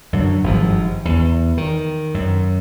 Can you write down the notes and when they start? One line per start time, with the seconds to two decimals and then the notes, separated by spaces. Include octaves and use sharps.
0.13 F#2 D3 F#3
0.44 G#1 G2 F3
1.05 E2
1.57 D#3
2.14 F#2